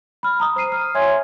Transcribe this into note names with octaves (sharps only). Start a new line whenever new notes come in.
B5 F6
A#5 D#6
C5 A#5 C7 D#7
F6
C#5 E5 G#5 C6 G#6